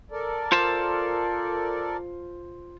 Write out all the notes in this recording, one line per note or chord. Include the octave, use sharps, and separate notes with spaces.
A4 A#4 D5
F4 C5 A5